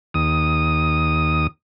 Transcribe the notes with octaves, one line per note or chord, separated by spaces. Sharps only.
D#2 D#6